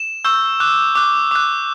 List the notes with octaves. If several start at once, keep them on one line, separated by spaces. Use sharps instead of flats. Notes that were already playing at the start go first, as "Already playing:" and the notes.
Already playing: E7
C#6 E6 G6
D6 F#6
D6 F#6
D6 F#6